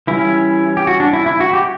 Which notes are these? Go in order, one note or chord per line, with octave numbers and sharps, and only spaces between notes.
E3 G3 C#4 E4
G4
F#4
D4
E4
E4
F#4
G4